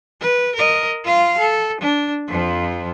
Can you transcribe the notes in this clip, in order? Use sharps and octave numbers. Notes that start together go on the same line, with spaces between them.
B4
A#4 D#5
F4 F5
A4
D4
F2 F3